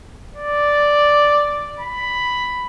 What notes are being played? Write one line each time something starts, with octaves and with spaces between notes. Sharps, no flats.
D5
B5